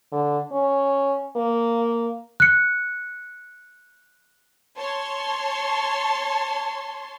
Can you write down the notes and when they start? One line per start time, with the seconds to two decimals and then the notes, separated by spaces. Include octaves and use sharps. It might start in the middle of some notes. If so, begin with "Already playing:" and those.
0.12 D3
0.52 C#4
1.36 A#3
2.40 F#6 C#7
4.78 C#5 A5 C6